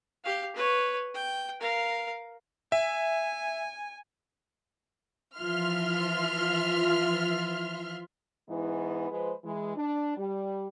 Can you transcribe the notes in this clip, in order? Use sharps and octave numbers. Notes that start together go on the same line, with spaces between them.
G4 F5
B4 C#5
G5
A#4 F5
E5 G#5
E3 F3 F4 E5 C6 F6
G#2 E3 B3 E4
F3 G#3 B4 C5
E3 G#3
D4
G3